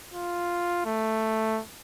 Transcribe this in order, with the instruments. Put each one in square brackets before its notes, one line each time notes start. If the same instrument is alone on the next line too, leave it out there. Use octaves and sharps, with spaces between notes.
[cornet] F4
A3